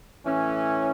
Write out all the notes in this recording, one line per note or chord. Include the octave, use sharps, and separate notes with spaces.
A2 E3 C#4